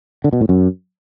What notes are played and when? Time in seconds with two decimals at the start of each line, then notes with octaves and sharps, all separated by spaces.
0.24 D3
0.33 B2
0.41 A2
0.49 F#2